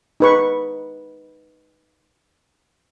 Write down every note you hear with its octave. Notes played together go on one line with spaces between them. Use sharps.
D#4 B4 C#6